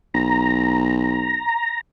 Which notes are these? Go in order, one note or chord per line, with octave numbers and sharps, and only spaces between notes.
B1 A#5